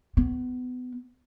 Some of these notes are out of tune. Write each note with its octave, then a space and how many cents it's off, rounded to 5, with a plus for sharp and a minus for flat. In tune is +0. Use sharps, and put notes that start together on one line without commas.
B3 +25